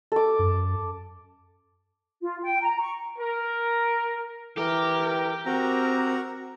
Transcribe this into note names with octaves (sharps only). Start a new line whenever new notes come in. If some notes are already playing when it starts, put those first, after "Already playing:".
A4 D6
F#2
F4
G5
A#5
C#6
A#4
E3 G4 A#4
C4 F#4 A#4 A#5